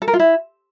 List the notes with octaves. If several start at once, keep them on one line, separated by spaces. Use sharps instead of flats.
A4
A#4
F4
E4